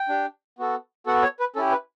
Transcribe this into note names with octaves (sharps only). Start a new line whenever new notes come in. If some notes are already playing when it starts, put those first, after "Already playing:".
Already playing: G5
D4 G4
B3 F#4 A4
B3 F#4 A4 F#5
C#5
B4
C#4 E4 G4 A4
B4